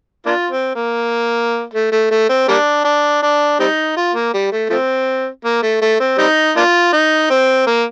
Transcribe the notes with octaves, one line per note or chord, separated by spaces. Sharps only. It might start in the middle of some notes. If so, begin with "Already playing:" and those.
A#3 D4 F4
C4
A#3
A3
A3
A3
C4
G3 A#3 D4
D4
D4
G3 C4 D#4
F4
A#3
G3
A3
F3 A3 C4
A#3
A3
A3
C4
G3 C4 D#4
A#3 D4 F4
D#4
C4
A#3